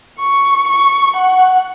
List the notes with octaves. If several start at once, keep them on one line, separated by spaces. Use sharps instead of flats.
C#6
C#6
F#5